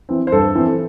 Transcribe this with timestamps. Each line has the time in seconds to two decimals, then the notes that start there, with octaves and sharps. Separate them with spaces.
0.09 E3 C4
0.27 C5
0.32 G2 A4
0.55 E3 C4